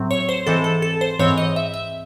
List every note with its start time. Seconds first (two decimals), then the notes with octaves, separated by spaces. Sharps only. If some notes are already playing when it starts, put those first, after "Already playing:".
Already playing: A2 F#3 C4
0.11 C#5
0.29 C5
0.46 G#2 E3 C4 A4
0.64 A4
0.82 A4
1.01 C5
1.19 G#2 E3 C4 C#5
1.38 D#5
1.56 E5
1.74 E5